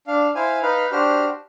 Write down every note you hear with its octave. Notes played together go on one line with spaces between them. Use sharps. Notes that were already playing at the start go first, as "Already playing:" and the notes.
D4 F5
E4 C5 F5 G#5
D#4 B4 F5
D4 F#4 G4 C5 F6